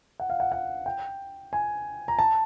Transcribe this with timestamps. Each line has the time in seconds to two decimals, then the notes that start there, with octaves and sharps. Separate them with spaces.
0.20 F#5
0.30 F5
0.40 F#5
0.52 F#5
0.86 G5
1.53 G#5
2.08 A#5
2.19 A5